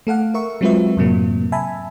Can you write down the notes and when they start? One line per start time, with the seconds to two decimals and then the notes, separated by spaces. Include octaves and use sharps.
0.07 A3 A4 F5 F#5
0.34 A#4 E5 C#6
0.61 F#3 G#3 C4 F4 B4 E5
0.97 F#2 A2 C3 F#3 A#3
1.52 E5 G#5 A5 B5